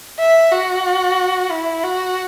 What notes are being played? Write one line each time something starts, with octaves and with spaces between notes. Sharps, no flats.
E5
F#4
E4
F#4